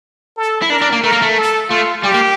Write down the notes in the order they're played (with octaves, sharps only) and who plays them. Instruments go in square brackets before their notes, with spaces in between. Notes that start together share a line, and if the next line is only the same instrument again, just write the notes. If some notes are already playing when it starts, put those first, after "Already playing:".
[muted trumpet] A4
[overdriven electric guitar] E4
[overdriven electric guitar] D4 [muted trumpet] A#4
[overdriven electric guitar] D4
A#3
[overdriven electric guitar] A3 [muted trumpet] A#4
[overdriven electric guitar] A#3
A3
[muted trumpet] A4
[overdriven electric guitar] A3 [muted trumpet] F4
[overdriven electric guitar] G3 [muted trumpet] G4
[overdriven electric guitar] A#3